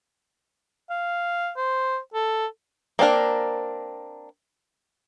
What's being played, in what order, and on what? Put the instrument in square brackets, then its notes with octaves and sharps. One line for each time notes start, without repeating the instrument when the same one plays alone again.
[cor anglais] F5
C5
A4
[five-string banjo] A#3 C4 D4 A#4